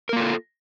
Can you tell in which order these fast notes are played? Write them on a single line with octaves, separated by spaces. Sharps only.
A#4 A#3 F4 A4